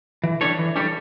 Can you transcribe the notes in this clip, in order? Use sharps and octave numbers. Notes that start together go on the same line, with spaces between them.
E3
G3 D4 A4 C#5
E3
G3 D4 A4 C#5